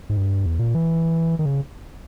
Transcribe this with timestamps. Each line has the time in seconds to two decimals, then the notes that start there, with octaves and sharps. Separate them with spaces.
0.09 G#2
0.16 G2
0.46 E2
0.59 A#2
0.75 E3
1.39 D#3
1.46 C#3